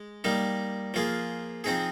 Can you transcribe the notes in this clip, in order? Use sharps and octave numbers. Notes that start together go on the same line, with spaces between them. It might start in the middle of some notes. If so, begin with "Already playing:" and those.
Already playing: G#3
G3 A#3 D#4
F3 A#3 F4 G#4
F3 C4 D#4 G#4